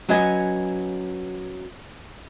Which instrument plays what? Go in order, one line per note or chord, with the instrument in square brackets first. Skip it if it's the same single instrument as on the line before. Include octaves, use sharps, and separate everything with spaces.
[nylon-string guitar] F#3 C#4 B4 D#5 G#5